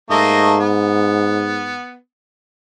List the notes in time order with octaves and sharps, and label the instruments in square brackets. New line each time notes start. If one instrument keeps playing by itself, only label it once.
[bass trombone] G#2 [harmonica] A3 A#3 D#5
[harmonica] B3